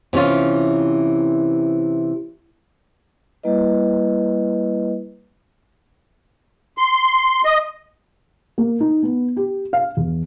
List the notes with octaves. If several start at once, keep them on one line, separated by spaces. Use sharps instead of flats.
C3 E3 C#4 F4
G3 A#3 E4 B4 D#5
C6
D#5
A#3
D#4
B3
G4
F5
E2